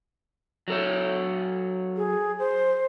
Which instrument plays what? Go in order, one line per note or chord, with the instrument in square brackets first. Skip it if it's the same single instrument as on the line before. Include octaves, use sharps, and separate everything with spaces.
[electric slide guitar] F#3 A4 C#5
[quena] G#4
C5